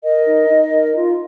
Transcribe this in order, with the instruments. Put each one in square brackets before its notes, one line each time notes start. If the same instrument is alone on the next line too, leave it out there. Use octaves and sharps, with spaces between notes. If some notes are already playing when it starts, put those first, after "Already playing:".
[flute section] A#4 D#5
D#4
D#4
A#4
F4